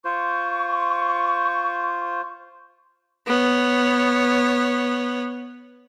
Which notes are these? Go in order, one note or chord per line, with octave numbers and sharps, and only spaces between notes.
F4 C5 C#6
B3 C#5